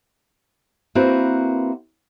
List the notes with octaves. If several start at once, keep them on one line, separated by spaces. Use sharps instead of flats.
A#3 C4 E4 F#4 A#4 B4